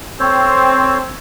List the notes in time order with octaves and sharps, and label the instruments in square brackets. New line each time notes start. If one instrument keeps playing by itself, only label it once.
[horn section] C4 [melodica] A4 C5 C#5